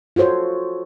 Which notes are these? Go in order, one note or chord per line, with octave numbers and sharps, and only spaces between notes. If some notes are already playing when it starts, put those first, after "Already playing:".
F4 F#4 A4 C5 C#5